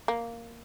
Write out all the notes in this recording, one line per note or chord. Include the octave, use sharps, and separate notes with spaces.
A#3